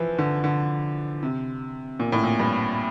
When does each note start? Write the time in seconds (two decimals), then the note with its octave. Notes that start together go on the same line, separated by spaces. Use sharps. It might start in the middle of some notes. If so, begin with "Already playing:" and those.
Already playing: E3 F3
0.18 D3
0.44 D3
1.23 C3
2.00 A#2
2.12 A2
2.24 A#2
2.39 G2